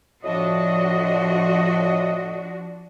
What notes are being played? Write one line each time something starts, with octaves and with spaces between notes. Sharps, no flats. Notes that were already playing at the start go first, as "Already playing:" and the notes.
A2 F3 D4 F#4 D#5